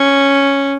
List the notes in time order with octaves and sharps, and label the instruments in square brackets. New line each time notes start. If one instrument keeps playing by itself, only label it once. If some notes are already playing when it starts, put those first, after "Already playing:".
Already playing: [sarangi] C#4